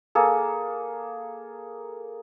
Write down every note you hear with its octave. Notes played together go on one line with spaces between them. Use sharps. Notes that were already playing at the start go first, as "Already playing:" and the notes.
A#3 G#4 A4